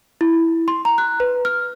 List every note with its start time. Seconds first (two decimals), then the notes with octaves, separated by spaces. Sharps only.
0.21 E4
0.68 C6
0.85 A#5
0.98 F#6
1.20 B4
1.45 F6